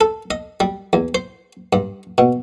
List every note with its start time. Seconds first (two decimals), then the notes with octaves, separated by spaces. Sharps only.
0.01 A4
0.31 D#5
0.60 G3
0.93 E2
1.15 C5
1.73 G2
2.18 B2